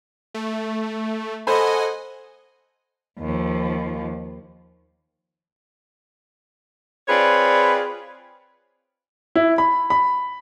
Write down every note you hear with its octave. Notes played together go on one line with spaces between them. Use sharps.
A3
A4 C5 D#5 F#5 G#5 B5
D#2 F3
C4 F4 G#4 B4 C#5 D5
E4
B5
B5